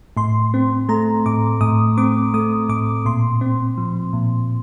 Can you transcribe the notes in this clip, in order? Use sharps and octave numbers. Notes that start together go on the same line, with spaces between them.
A2 C6
C4
A3 A#5
A2 D6
A2 D#6
C4 D6
A3 D#6
A2 D6
A#2 C6
C4
F3
A#2